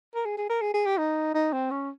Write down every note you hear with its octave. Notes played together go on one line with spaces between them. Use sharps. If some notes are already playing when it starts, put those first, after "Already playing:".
A#4
G#4
G#4
A#4
G#4
G#4
G4
D#4
D#4
C4
C#4